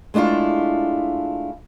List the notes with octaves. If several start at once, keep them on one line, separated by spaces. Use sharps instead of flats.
G#3 A3 D4 E4 F4